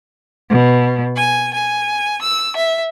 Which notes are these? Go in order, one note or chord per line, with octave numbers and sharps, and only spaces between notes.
B2
G#5
G#5
E6
E5